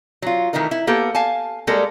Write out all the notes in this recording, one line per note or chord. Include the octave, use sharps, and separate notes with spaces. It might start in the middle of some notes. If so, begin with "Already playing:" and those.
F#3 F4
D#3 E3 A3 D#4 A#4
E4
A#3 B3 G4 A4
F5 G#5 A5
G3 G#3 A#3 A4 A#4